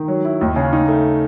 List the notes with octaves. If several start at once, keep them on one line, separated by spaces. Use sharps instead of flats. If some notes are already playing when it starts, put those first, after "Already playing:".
Already playing: D#3
F#3
E4
D#2
C#3
D#4
A3